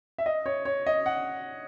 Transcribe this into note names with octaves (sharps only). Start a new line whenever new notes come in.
E5
D#5
C#5
C#5
D#5
F#5